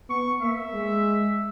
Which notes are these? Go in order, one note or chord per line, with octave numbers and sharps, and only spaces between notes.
B3 C#6
A#3 E5
G#3